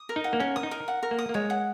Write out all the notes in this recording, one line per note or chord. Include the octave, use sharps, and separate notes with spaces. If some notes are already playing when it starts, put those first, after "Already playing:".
Already playing: D#6
A#4
D#4
F#5
A#3
C#4 A#4
D#6
D#4
A#4
F#5
A#4
A#3
D#6
A#3
G#3 C#5
F#5